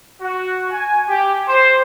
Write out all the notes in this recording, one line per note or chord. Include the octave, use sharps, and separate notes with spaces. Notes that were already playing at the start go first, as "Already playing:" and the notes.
F#4
G#5
G4
C5